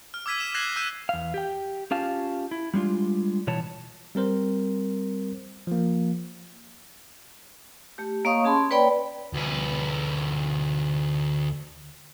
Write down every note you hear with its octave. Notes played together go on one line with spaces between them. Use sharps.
F6
D6 E6 G#6 B6 D#7
E7
F#6 G#6 A#6 C7 E7 F#7
E6 G6 D#7 E7
E2 F5
G4 G5
C#4 F4 G4 F5 A5
E4
G3 G#3 D4 F4
B2 E3 C#5 A5
G3 C4 A#4 C5
F3 A#3
A3 G4
A#3 C#5 D#5 F5 C#6 D#6
C#4 G#4 A5 B5 C6
A#3 B4 C#5 D5 G5 B5
D2 B4